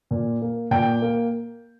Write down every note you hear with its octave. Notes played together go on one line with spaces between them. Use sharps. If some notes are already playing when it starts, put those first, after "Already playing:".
A#2
A#3
A#2 G5
A#3